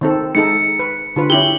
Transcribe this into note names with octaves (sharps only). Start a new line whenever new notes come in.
D#3 C4 A4
G#3 D#4 A4 C#7
B4
D3 F4 B4
C#4 E4 G4 F#7 G7